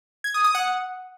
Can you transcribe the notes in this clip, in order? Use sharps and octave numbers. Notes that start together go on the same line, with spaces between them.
G#6
D#6
D#6
F#5